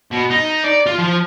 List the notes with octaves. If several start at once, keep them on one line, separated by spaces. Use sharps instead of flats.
B2
D#4
D5
F4
F3